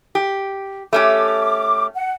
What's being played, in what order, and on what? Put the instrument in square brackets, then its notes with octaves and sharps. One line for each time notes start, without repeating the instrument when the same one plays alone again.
[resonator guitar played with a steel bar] G4
[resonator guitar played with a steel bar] A3 C#4 G4 [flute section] D6
[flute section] F#5